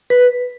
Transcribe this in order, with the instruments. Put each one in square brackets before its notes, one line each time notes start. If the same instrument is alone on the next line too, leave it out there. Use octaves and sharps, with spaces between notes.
[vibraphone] B4